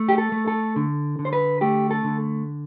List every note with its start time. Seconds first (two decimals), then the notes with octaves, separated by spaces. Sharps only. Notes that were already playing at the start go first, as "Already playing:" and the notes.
Already playing: A3
0.09 G4
0.18 A4
0.32 A3
0.47 A4
0.76 D3
1.19 D3
1.25 C5
1.33 B4
1.61 A3 G4
1.91 A4
2.04 D3